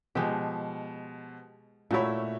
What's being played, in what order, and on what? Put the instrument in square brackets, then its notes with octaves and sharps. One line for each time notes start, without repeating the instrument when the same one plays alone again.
[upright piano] B2 F3 [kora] G#3 G4
[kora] A#2 E4 [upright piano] A3 F#4 C#5